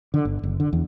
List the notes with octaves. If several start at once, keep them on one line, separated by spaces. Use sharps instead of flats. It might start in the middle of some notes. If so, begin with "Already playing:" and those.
D3
G1
F#1
D3
E2